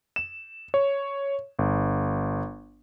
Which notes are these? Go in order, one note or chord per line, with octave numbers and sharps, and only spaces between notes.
E7
C#5
G1